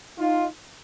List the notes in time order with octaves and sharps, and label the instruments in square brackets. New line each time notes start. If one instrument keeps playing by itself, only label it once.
[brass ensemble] D#4 F4